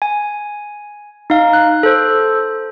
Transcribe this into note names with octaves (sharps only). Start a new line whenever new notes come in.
G#5
D#4 F5
F#6
A4 C5